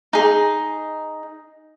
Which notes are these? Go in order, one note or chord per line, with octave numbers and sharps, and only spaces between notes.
D#4 G#4